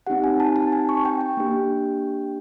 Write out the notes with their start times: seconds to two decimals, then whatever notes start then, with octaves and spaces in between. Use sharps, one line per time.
0.07 C4 D#4 G4 F#5
0.24 G#5
0.40 A5
0.56 A5
0.72 G#5
0.89 C#6
1.05 G5
1.21 G5
1.37 A#3 D4 G4